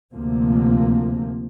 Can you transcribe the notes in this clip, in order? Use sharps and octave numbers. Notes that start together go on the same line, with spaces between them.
D2 C3 F3 A#3